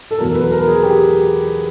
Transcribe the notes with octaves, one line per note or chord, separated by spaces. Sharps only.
A4
E2 B2 F#3 A#4
B4
A#4
G#4
G4